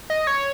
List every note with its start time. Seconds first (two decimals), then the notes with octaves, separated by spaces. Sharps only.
0.10 D#5
0.27 C#5